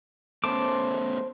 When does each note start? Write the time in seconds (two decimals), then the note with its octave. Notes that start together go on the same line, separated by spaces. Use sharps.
0.44 A3 B3 C#4 C5 A5 D6